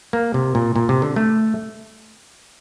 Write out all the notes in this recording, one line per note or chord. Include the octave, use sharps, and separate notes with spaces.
A#3
C3
A#2
A#2
C3
D3
A3